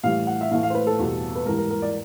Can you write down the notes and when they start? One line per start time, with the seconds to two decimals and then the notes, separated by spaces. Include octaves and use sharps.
0.04 A2 E3 G3 F5
0.27 F#5
0.41 E5
0.51 A2 E3 A3 F5
0.63 F5
0.70 C5
0.75 B4
0.87 A4
0.99 E2 B2 G3
1.36 B4
1.46 G#2 E3 G3 A#4
1.58 A#4
1.70 A#4
1.82 D5